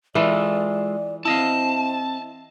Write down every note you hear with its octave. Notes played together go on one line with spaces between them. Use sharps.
E3 G#3 F4 A4 D5
C4 E4 D#5 F5 A5